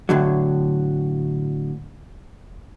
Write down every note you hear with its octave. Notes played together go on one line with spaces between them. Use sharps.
A2 D3 F#3